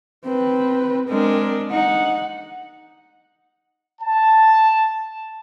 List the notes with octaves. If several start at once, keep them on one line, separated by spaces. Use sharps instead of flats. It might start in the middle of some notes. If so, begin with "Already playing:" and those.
C4 B4
G#3 C4 D4 A#4
D#4 F#5
A5